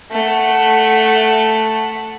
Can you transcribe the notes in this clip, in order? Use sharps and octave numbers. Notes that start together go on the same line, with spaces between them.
A3 F#5